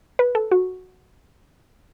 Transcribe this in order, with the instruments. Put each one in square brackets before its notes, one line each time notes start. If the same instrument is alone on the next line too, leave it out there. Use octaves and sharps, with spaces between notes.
[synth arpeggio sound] B4
A4
F#4